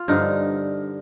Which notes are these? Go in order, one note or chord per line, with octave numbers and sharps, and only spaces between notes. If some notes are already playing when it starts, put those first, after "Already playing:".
Already playing: F4
G2 D3 F3 D#4